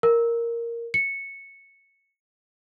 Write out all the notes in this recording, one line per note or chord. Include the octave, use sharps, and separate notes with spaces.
A#4
C#7